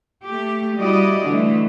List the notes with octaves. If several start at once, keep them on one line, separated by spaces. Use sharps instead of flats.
A3 G4
G3 E4 F#4 D5 D#5
D3 E3 A3